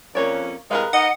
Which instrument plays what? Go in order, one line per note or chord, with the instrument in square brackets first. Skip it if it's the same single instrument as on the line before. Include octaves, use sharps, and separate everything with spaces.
[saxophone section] F2 C#4 [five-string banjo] A#3 C#5 D5
[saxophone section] A2 C3 G#3 [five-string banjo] A#4 B4 F5
[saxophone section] D#4 D#5 [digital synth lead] F#5